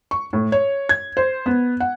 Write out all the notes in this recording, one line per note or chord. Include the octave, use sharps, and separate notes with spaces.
C#6
A2
C#5
G#6
C5
B3
F#5